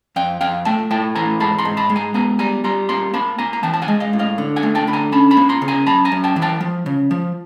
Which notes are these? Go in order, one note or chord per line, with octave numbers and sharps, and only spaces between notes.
F2 F5 G5
F2 F5 G5
A3 G5 A5
A2 G5 A5
E3 G#5 A#5
G#2 A5 B5
A#5 C6
G#2
A5 B5
G#3
G#5 A#5
B3 G#5 A#5
G3 G#5 A#5
G3 A#5 C6
A#3 A#5 C6
A#3 A5 B5
A#3 G#5 A#5
A#5
E3 G5 A5
A5
F#5 G#5
G#3
D#5 F5
A2
D#5 F5
D3
F#5 G#5
A3
G5 A5
D3 B5
G#5 A#5
C#4 A5 B5
A5 B5
A#3
A#5 C6
C#3
G#5 A#5
F#2 A5 B5
G#5 A#5
F#2
G5 A5
E3
G5 A5
F3
C#3
F3